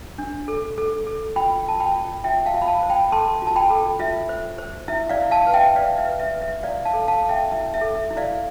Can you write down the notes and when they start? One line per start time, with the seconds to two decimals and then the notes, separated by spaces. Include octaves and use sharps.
0.18 D4
0.48 A4
0.78 A4
1.07 A4
1.36 F4 G5 B5
1.66 F4 A5
1.80 G5 B5
1.95 F4
2.24 F4 E5 G5
2.46 F5 A5
2.54 F4
2.62 B5
2.68 F5 A5
2.83 C5
2.90 G5 B5
3.12 A4 A5 C6
3.42 F4 A5
3.56 G5 B5
3.70 A4
3.99 F4 E5
4.29 C5
4.58 C5
4.88 E4 E5
5.09 D5 F5
5.17 E4
5.31 F5 A5
5.47 B4
5.53 E5 G5
5.76 B4 D5 F5
5.98 E5
6.05 B4
6.20 E5
6.34 B4
6.41 E5
6.63 E4 D5 F5
6.85 F5 A5
6.93 A4
7.08 F5 A5
7.23 A4
7.29 E5 G5
7.51 E4 E5
7.74 E5
7.81 A4
7.95 E5
8.11 E4
8.17 D5 F5